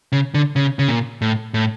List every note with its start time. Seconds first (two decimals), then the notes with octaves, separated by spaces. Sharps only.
0.12 C#3
0.34 D3
0.56 C#3
0.79 C#3
0.88 A#2
1.22 A2
1.54 A2